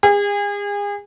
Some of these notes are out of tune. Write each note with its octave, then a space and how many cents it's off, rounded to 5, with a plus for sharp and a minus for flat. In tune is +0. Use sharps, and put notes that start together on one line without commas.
G#4 -35